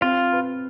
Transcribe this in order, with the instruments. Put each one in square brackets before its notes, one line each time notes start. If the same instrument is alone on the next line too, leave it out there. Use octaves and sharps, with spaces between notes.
[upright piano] C4 [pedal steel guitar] F4
[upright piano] B4